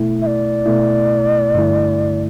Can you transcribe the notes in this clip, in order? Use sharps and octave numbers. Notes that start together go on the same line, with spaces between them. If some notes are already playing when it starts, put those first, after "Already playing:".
Already playing: B2 A3 E4
E5
D5
B2 A3 E4
G2 D3 A3 E4